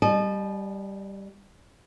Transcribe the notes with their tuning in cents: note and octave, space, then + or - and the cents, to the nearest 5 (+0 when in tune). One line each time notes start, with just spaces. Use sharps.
G3 +0 D#5 -30 A5 -45